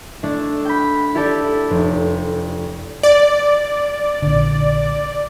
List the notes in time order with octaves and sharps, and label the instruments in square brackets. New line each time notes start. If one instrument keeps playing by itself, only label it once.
[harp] A3 D4 E4
G5 B5
E4 G4 A4 D5
F1
[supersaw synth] D5
[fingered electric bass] A#1 D3